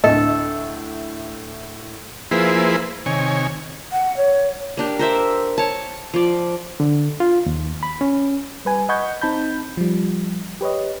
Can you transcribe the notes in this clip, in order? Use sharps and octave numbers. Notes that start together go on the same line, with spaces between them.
D2 A2 A4 D#5 E5
F3 A#3 E4 G#4 B4 C5
C3 D#3 C#5 G#5
F#5
C#5
A#3 D4 G4
A#4 C5 E5
C#5 A5
F3 D5
D3
F4
D#2
B5
C#4
G3 B4 G#5
D#5 F#5 B5 C#6 G6 G#6
C4 D#4 A5 B5 G6
F3 G3
G4 B4 C#5 D#5